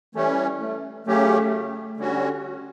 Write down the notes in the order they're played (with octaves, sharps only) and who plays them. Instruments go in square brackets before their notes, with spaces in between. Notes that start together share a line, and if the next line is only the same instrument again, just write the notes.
[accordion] E3 G3 C#4 [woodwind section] A3
[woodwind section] A3
[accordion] C#3 F#3 C#4 G4 [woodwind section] A3
[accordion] D3 G3 C#4 F#4